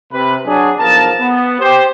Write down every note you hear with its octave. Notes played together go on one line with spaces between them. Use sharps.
C3 B4
F#3 D4 F#4 G#4
B1 E2 F3 A#4 A5
B3
G4 C5